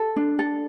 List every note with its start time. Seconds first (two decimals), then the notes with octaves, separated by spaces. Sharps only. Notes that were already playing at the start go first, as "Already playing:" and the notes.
Already playing: A4
0.16 D4
0.39 A4